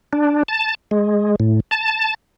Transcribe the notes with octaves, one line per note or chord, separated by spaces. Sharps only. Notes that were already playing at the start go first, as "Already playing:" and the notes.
D4
A5
G#3
A2
A5